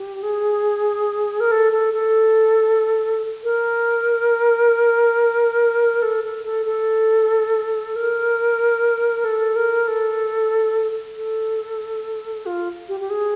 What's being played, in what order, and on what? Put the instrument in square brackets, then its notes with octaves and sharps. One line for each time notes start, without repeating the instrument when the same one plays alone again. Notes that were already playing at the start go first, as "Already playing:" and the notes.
Already playing: [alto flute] G4
G#4
A#4
A4
A4
A4
A#4
A4
A4
A4
A4
A#4
A4
A#4
A4
A4
F4
G4
G4
G#4